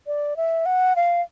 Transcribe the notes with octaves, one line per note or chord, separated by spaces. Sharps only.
D5
E5
F#5
F5